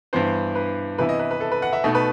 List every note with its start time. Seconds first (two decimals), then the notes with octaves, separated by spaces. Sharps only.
0.13 G2 E3 B3 C5
0.55 B4
0.98 C3 E3 B3 E4 B4
1.09 D#5
1.19 B4
1.31 B4
1.40 A4
1.52 B4
1.62 F#5
1.73 E5
1.84 B2 A3 D#4 D#5
1.95 B4